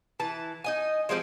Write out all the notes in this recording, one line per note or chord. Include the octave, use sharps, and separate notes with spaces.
E3 A5
D#4 D#5 G#5
F3 G#3 C4 G4